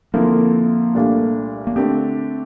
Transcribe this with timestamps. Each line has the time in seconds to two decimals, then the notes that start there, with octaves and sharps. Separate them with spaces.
0.14 D3 F3 A#3 C4 E4 A#4
0.94 C2 A#2 A3 D4 F4
1.67 A#3
1.76 D3 A3 C4 D4 G4